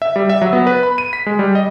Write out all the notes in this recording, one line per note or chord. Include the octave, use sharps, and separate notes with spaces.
E5
G3
E5
F#3
B3
B4
B5
D#7
B6
G#3
G3
D#5